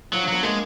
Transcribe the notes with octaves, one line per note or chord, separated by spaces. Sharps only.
F3 F#3
D4
F#3 B3
G#3 A#3